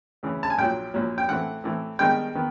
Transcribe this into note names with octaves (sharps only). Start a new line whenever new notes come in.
D2 C#3 E3
A5
G#5
A#1 A#2 F#3 G5
A#1 A#2 F#3
G5
A2 E3 A3 C4 F#5
A2 E3 A3 C4
G2 D#3 G#3 B3 G5
D#3 B3